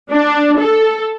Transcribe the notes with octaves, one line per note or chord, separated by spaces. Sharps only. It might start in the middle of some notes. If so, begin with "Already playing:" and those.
D4
A4